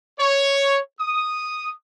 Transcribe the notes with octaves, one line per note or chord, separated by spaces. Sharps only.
C#5
D#6